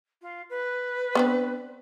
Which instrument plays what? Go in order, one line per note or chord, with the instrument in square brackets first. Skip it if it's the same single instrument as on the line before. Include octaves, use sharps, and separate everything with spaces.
[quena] F4
B4
[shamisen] B3 C4 D4